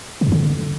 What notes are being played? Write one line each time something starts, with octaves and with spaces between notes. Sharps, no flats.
C3
F2
D3